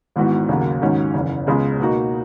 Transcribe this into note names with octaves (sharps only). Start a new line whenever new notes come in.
G#1 G#2 E3 B3 F#4
D#2 C#3 F#3 A#3
G#2 D#3 F#3 C#4
F#1 E2 C#3
C#2 C#3 G#3 B3
B2 A#3 D#4 F#4